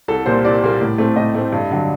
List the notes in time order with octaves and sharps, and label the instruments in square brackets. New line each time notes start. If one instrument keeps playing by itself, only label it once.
[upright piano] C2 A4
A#2 G3 A#3 C5
C2 D5
A#2 G3 A#3
A2
A3 C4
A2 D#5
A3 C4
G2
D3 F#3